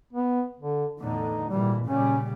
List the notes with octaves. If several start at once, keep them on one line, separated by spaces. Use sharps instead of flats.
B3
D3
E2 A2 D3 D#4
G#1 A#2 E3 G3
A#2 C#3 G3 C#4